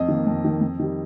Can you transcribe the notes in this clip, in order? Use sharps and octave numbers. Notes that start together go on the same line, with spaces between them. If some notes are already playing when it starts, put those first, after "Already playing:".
Already playing: F2 D#5
D#3 A#3
F2
D#3 A#3
F2
D#3 G3